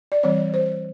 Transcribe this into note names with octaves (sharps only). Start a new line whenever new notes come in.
D5
E3 G3 C4 C#5
C5